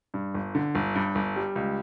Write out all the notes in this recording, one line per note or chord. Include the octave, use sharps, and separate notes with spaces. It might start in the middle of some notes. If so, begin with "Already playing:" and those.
G2
G1
D3
G1
G2
G1
G3
C#2